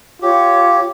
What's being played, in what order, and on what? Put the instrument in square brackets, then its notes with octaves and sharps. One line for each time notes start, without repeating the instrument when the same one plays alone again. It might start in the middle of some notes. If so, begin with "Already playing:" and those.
[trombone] F4 [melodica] G4 [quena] C#5